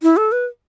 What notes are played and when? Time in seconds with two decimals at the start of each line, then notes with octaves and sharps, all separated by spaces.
0.03 E4
0.17 A4
0.32 B4